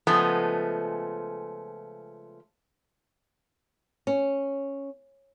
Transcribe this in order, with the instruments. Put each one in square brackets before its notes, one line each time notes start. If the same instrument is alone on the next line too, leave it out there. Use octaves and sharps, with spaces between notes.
[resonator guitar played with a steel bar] C#3 F3 G#3 A3 B3
[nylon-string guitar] C#4